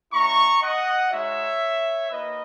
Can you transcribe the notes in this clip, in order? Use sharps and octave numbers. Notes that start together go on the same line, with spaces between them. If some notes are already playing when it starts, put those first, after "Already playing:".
G#3 C#4 E4 A#5 C#6
D#5 F#5
G#3 D#4 F#4 C#5 E5
A#3 D#4 F#4 B4 D#5